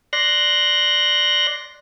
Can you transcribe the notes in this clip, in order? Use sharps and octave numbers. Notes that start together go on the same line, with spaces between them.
D5 C6 F#6 A#6